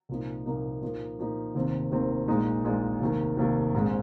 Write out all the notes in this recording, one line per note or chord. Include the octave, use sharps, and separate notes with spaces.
C2 A#2 F3 A#3 D#4
C2 A#2 F3 A#3 D#4
A#2 F3 A#3 D#4
A#2 F3 A#3 D#4
F1 D#2 D#3 C4
F1 D#2 D#3 C4
A#1 A#2 G#3 D#4
A#1 A#2 G#3 D#4
F1 D#2 D#3
F1 D#2 D#3
A#1 G#2 G#3 C4